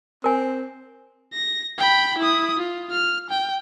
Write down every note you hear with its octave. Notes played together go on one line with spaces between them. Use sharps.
C4 A#4 G#5
A#6
G5 B5
E4 D#6
F4
F6
G5